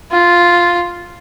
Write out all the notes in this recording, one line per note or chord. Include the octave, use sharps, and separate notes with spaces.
F4